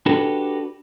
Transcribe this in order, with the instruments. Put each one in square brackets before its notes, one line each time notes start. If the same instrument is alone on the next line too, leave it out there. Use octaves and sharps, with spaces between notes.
[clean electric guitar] D4 F#4 G4 A4 B4